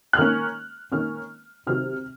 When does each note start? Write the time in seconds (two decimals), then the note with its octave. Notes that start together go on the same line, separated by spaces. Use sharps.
0.13 F#6
0.17 D#3 A#3 C#4 F6
0.91 D#3 A#3 C#4 F6
1.67 C3 D#3 F#3 F6